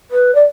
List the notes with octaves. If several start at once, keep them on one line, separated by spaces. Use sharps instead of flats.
B4
D5